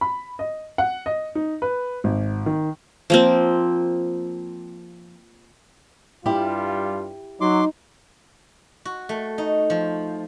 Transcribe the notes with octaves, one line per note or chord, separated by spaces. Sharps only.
B5
D#5
F#5
D#5
D#4
B4
G#1
D#3
F3 A#3 C4
G2 G3 E4 F4 G4
F#3 D#4 C6 D6
F#4
A3
D#4
F3